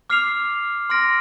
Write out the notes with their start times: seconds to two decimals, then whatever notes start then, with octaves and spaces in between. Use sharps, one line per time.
0.10 D6 F6 C7 F7
0.90 C6 F6 A#6 D7